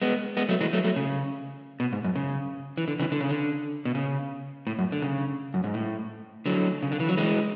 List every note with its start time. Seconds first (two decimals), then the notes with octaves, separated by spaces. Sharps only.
0.02 G#3 B3
0.37 G#3 B3
0.49 F#3 A3
0.61 E3 G#3
0.73 F#3 A3
0.84 F#3 A3
0.96 C#3
1.80 B2
1.93 G#2
2.04 F#2
2.16 C#3
2.78 E3
2.88 D3
2.99 C#3 E3
3.12 D3
3.21 C#3
3.29 D3
3.85 B2
3.95 C#3
4.67 A2
4.79 F#2
4.92 D3
5.02 C#3
5.54 F#2
5.64 G#2
5.74 A2
6.46 D3 F#3
6.83 C#3
6.92 D3
7.00 E3
7.09 F#3
7.17 E3 G#3